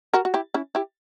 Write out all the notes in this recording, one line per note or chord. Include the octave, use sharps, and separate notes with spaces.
F#4 A#4
F#4
E4 G4
C#4 E4
E4 G4